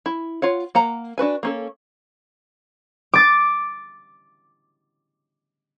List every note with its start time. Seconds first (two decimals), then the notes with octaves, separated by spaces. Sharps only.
0.06 E4
0.42 F4 C#5 F#5
0.75 A#3 F#5 A#5
1.18 D4 F#4 B4 G#5
1.43 A#3 C#4 A4
3.14 D6 A6